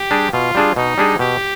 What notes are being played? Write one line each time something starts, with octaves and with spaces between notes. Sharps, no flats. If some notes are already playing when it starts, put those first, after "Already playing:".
Already playing: G4
G3 D4 G#4
B2 F4
G3 D4 G#4
B2 D#4
G3 D4 G#4
B2 G4